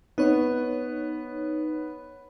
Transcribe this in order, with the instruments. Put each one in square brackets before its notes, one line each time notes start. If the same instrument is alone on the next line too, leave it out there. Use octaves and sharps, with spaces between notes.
[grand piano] B3 [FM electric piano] D#4 C#5